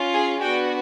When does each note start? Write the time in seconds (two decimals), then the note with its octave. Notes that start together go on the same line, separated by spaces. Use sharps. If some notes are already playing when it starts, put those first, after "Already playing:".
Already playing: C#4 F4
0.13 G#4 G#5
0.40 B3 D4 F#4 G4 G5